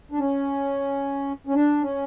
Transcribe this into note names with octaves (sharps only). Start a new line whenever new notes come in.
D4
C#4
C#4
D4
C#4